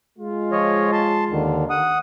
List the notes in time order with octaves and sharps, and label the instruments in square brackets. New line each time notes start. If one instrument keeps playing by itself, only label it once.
[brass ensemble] G#3 F4
[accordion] F3 C#5 D#5
A5 C6
D#2 D3 D#3
F#5 D#6